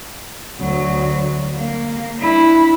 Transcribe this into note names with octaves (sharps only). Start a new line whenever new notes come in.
D2 F#3
A#3
D4 E4